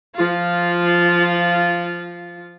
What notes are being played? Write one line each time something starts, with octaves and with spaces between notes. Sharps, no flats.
F3 F4